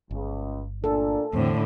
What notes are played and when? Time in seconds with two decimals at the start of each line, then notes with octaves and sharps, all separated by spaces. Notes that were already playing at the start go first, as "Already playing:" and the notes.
0.11 G1 C#2
0.84 A#2 D4 A4
1.33 E2 A2 D3 C4